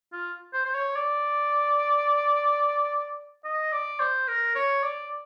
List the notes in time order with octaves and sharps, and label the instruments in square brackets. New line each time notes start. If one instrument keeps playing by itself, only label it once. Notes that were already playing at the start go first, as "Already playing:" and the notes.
[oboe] F4
C5
C5
C#5
D5
D#5
D5
C5
A#4
C#5
D5